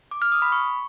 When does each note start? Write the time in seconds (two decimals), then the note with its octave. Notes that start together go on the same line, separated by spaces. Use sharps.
0.11 D6
0.22 F6
0.32 D#6
0.42 B5
0.52 C#6